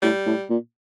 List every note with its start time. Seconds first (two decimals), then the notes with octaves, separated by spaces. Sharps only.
0.02 A2 G3
0.26 A2
0.49 A#2